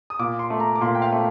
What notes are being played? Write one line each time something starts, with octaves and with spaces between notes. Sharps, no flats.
D#6
A#2 D6
C6
A3
A#5
D6
A#2 C6
G5
F5
A3